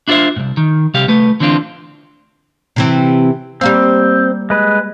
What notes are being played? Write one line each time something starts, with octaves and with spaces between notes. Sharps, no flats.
D4 E4 F4 G4 C5 E5
C2 G#2
D#3
C3 G3 G4 F5
C2 A3 B4
D3 E3 C4 D4 F4
C3 E3 C4
G3 A#3 C4 F5
G#3 B4